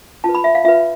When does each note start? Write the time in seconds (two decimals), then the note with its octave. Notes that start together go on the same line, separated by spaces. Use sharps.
0.24 F4 B4 A5
0.35 B5
0.44 E5
0.55 F5
0.64 F4 B4 E5